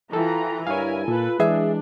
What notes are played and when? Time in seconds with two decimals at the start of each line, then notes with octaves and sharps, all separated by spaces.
0.13 E3 F4 A4 G5 A#5
0.67 G2 E4 A#4 C#5 F5 G#5
1.08 A#2 F4 A4 B4
1.40 E3 G#3 D4 G#4 E5